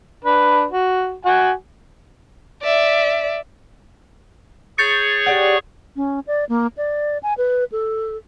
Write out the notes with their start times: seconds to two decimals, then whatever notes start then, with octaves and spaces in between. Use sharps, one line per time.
0.25 D4 B4
0.71 F#4
1.25 F#4 F#5 G#5
2.63 D5 E5
4.78 G#4 C#5 C#6 G6 A6 C#7
5.26 G4 D5 F#5
5.96 C#4
6.27 D5
6.49 A#3
6.77 D5
7.23 G#5
7.38 B4
7.72 A4